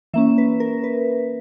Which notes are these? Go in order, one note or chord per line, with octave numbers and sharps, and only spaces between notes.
E3 A#3 C#4 E5
B4
A#4
B4